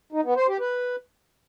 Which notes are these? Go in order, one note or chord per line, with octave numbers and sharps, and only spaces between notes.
D#4
B3
C5
G4
B4